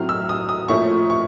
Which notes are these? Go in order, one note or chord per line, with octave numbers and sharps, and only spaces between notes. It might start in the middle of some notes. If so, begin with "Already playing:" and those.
Already playing: A2 F#3 A3 C4 F6
E6
D#6
D#6
A#2 F3 A3 C#4 E4 C#6
C#6